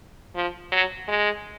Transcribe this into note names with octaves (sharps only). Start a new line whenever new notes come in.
F3
F#3
G#3